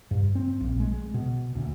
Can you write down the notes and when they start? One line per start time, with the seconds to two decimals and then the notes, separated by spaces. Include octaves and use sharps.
0.11 G2
0.35 C4
0.60 A#1
0.80 G#3
1.14 B2
1.56 D2